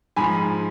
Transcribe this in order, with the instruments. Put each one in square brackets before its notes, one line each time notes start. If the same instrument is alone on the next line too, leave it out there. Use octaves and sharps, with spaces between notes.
[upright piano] G#2 F3 G#5 B5